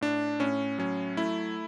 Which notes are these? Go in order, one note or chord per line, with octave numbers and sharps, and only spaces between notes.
A2 D4
A2 C#4
F#3 C#4
A3 E4